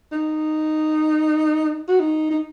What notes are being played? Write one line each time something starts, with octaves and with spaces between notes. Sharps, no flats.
D#4
F#4
D#4
D#4